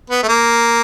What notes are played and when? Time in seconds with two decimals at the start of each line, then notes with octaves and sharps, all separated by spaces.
0.10 B3
0.23 A3
0.28 A#3